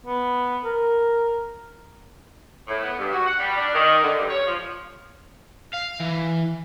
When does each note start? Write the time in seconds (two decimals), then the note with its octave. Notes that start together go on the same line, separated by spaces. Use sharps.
0.06 B3
0.64 A#4
2.68 A2
2.82 B3
2.98 G2
3.13 F#4
3.27 F#5
3.39 G3
3.58 D4
3.75 D#3
4.03 D3
4.18 G2
4.30 C#5
4.46 F3
5.73 F5
6.00 E3